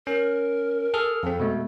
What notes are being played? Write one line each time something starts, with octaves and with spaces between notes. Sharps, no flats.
C#4 A#4
G#4 A4 F6
F2 C4 A4
B2 G#3 A3